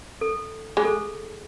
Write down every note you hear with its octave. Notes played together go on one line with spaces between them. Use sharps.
A4
G#3 G#4
A4